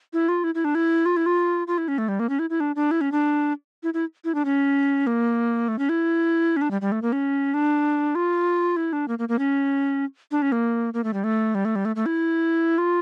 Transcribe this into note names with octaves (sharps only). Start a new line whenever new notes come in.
E4
F4
E4
E4
D4
E4
F4
E4
F4
F4
E4
C#4
A3
G3
A#3
C#4
E4
E4
D4
D4
E4
C#4
D4
E4
E4
E4
D4
C#4
A#3
A3
C#4
E4
C#4
D4
G3
G3
A3
A#3
C#4
D4
F4
E4
D4
A#3
A#3
A#3
C#4
D4
C#4
A#3
A#3
A3
G3
A3
G3
A3
G3
A3
A3
E4
F4